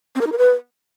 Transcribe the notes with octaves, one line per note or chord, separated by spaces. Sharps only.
C4
A#4
D#4
A#4
B4